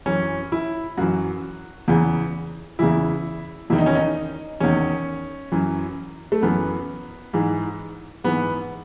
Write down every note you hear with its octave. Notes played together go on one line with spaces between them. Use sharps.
F#2 E3 C#4
E4
F#2 E3 F#4
E2 C#3 E3
E2 C#3 E3 E4
E2 D#3 E4
D#4
C#4
D#4
E2 D#3 C#4
F#2 E3
A3
F#2 E3 B3
G#2 E3
G#2 E3 B3